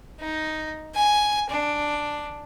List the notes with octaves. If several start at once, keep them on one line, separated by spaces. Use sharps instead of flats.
D#4
G#5
D4